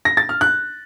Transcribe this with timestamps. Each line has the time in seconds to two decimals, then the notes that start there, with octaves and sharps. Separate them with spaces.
0.05 A#6
0.17 A6
0.29 F6
0.41 F#6